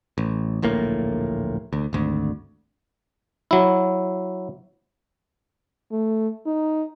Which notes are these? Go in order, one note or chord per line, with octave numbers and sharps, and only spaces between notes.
A1
D1 A#1 A2 A#3
D2
G#1 D2
F#3 E4
A3
D#4